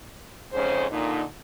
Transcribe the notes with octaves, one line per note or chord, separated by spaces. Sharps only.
F2 G#2 C#3 C#4 C5
A#2 D3 D#4